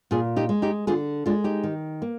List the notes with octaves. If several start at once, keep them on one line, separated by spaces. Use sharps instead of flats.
A#2 F4 G#4
D#4 G4
G#3
D#4 G4
D3 F4 G#4
G#3 D4 F4
D#4 G4
D#3
A#3